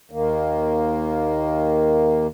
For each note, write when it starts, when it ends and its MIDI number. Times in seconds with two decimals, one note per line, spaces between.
0.11 2.27 39
0.11 2.27 51
0.11 2.27 58